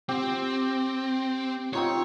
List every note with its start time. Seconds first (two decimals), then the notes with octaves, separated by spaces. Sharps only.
0.09 C4 G4
1.73 C4 D#4 F4 C#5